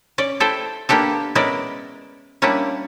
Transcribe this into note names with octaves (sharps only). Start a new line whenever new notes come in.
C#4 D5
E4 A4 C5 G5
A#3 B3 D4 G4 A4
G#3 B3 C#4 E4 A#4 D5
G3 A#3 C#4 D4 E4